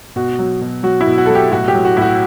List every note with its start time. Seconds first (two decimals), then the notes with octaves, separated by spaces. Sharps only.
0.16 B2 F#4
0.39 F#3
0.61 B2
0.83 F#3 F#4
1.01 E4
1.07 B2
1.18 F#4
1.26 F#3 A4
1.35 G4
1.51 A2 F#4
1.68 G4
1.74 F#3
1.85 F#4
1.97 A2 E4
2.02 F#4